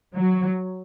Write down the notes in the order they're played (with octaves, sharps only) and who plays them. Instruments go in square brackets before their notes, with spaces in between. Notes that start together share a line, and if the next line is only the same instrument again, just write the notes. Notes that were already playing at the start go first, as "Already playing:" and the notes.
[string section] F#3